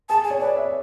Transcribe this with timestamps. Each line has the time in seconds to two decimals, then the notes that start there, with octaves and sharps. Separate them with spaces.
0.09 G#4 A5
0.24 G#5
0.30 C#5
0.40 B4 D5
0.57 E5